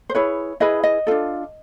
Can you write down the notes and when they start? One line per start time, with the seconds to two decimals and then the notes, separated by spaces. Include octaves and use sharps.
0.10 C5
0.15 E4 G#4 B4 C#5
0.60 E4 G#4 B4 D#5
0.84 D#5
1.07 D4 F4 A4